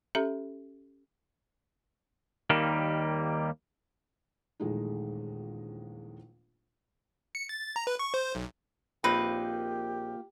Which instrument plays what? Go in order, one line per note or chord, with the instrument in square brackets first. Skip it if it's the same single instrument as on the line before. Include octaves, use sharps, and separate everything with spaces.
[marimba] C#4 G4 A4 E5 A#5
[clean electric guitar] D#2 D#3 G3 A#3
[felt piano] D#1 A#1 E2 G#3 A3 D#4
[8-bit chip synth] C#7
A6
A#5
B4
C#6
C5
B1
[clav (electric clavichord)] A#1 C4 D#4 [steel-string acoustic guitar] A#3 F4 [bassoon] G4 [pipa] B4